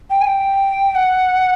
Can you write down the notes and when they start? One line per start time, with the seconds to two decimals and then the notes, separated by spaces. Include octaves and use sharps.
0.10 G5
0.21 G#5
0.27 G5
0.95 F#5